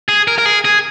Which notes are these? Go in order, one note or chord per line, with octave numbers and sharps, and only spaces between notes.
G#4
A#4
A#4
G#4
G#4